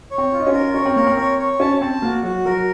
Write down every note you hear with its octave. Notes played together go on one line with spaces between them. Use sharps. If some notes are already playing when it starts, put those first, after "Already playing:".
C#5
C4
F4
D#4
C#4
A#4
C#4 C#5
C4
A#3 A#4
C4
C4 C#5
C#5
C#4 A5
C4 A5
A#3 F#4
F#3 F#4
F#3 A#4